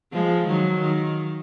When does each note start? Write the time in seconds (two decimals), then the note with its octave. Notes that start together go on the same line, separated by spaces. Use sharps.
0.12 F3 G#3
0.46 D#3 F#3
0.81 D#3